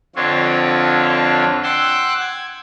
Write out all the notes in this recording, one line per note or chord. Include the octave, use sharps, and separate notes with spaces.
F2 D3 C4 D4 F4 C#5
F#5 G5 C6 D6 E6 F#6
G#6